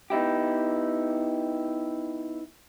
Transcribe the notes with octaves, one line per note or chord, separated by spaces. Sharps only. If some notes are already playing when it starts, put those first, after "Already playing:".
B3 D#4 E4 G4